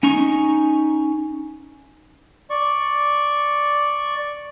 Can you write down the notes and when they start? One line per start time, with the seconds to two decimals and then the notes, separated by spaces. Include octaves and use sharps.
0.03 C#4 D#4 A#5 C#6
2.50 D5 C#6